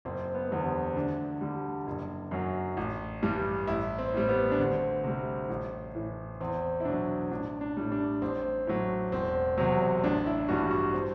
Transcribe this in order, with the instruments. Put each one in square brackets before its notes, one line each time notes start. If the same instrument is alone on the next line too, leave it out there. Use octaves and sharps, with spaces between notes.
[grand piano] F#1 C4
B3
E2 D3 G3
B3
C4
D2 D4
D3 G3
F#1
F#2 F#3
A1
G2 E3 G3
A1 E4
C4
A2 G3
B3
D4
D2 C4
C3 G3
A1
A2 E3
E2 C4
E4
B2 F#3 D4
A1 D4
D4
A2 G3
D4
A1 C4
A2 F#3
E1 C4
E2 C3 F#3
A1 D4
E4
G2 E3 G3 F#4
F#4
C4